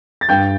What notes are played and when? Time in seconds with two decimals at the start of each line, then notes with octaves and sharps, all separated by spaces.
0.21 A6
0.29 G2 G5 G6